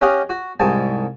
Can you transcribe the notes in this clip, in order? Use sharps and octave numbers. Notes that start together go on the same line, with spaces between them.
C#4 G4 D#5 F5 F#5
F#4
C2 G#2 G#5 A5